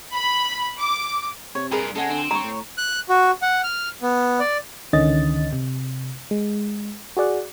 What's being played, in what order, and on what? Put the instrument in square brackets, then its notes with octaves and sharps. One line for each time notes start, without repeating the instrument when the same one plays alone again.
[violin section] B5
D6
[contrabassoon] C3 [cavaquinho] C#5
[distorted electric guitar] G2 A#2 [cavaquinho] G#4 A#4 B4
[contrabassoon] C#3 [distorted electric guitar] G#3 [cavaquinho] A4 F#5 G#5
[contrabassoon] D3 [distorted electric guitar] C4
[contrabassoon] G2 [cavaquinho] C#5 C#6 [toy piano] A#5
[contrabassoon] A2
[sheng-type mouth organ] F#6
F#4
F#5
F6
B3
D5
[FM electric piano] C#2 D3 D#3 C#4 D#5 A6
C3
G#3
F#4 G#4 D5 F#5